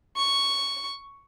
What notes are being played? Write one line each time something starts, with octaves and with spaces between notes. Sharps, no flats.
C#6